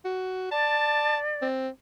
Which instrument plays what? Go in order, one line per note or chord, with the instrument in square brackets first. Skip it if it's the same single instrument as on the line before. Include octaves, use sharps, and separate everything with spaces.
[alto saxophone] F#4
[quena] D5 [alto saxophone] A5
[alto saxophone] C4